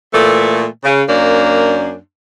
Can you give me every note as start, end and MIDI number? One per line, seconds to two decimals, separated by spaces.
0.12 0.65 46
0.12 0.65 52
0.12 0.65 57
0.83 1.02 49
1.07 1.96 42
1.07 1.96 58
1.07 1.96 62